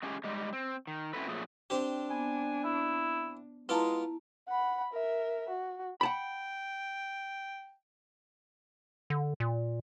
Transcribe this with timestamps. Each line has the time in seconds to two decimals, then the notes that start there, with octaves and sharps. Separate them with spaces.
0.03 G#3 A3 C#4 G4 G#4
0.24 G3 G#3 D#4
0.53 C4
0.87 D#3
1.13 C4 C#4 E4 F#4 A4 B4
1.28 A#2 F3 F#3 A3 G#4
1.70 C4 D4 G4 C5
2.10 B3 G#5
2.64 E4
3.69 G#3 B3 E4 F4 A5 A#5 D6
4.48 F#5 B5
4.93 A#4 E5
5.49 F#4
6.01 F#5 G5 A5 B5
9.10 D3
9.40 A#2